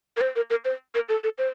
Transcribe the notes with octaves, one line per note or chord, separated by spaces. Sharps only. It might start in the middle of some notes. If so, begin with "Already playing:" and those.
A#4
C5
A#4
A#4
C5
A#4
A4
A4
C5